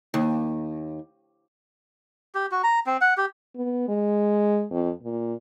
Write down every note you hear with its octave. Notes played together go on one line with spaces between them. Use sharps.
D#2
G4
F#4
A#5
C4
F#5
G4
B3
G#3
F2
A#2